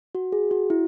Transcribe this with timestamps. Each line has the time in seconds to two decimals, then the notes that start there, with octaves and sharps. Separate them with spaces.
0.15 F#4
0.32 G#4
0.51 F#4
0.70 E4